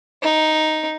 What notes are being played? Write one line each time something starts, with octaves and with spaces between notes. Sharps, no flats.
D#4